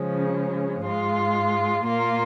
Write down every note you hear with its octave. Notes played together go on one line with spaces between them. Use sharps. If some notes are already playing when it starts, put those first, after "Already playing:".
Already playing: C#3 F3 G#3 C#4
G#2 G#3 F4
A#2 A#3 F4 A#4